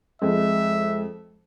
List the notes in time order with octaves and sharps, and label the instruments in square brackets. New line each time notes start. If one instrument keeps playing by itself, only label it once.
[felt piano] F2 [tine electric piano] G#3 [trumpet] E5